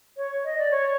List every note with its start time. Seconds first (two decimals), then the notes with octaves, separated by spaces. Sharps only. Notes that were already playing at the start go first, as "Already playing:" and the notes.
0.17 C#5
0.44 D#5
0.58 D5
0.71 C#5